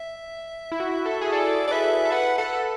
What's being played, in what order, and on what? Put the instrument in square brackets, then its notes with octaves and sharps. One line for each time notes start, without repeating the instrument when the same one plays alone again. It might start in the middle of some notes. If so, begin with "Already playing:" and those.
Already playing: [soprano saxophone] E5
[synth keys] E4
F#4
A4
G#4
[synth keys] A4 [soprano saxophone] D5
[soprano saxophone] D5
[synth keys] B4 [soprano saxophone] E5
[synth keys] A4
[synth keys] B4 [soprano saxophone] F#5
[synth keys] A4 [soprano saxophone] F#5
[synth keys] B4
A4